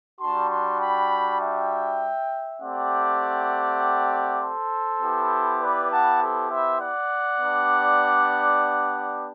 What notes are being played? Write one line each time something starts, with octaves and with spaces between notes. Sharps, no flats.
G3 D4 F#4 A5 C6
A5 C6
G5 B5
E5 G5
A3 C4 G4 D5 F#5
A4 C5
B3 E4 G4
B4 D5
F#5 A5
A4 C5
C5 E5
D5 F#5
B3 D4 G4